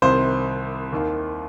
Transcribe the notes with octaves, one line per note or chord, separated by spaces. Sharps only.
C2 C3 D#3 C5
D#2 D#3